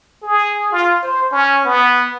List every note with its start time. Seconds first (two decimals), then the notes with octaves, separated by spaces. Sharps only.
0.23 G#4
0.72 F4
1.03 C5
1.32 C#4
1.65 B3